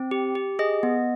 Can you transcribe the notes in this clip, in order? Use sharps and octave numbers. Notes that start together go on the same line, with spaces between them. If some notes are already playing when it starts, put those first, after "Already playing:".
Already playing: C4
G4
G4
G#4 D#5
B3